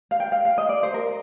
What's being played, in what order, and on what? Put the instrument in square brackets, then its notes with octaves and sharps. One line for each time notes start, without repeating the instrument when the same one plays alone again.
[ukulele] F5
G5
F5
F5
D#5
D5
C5
A#4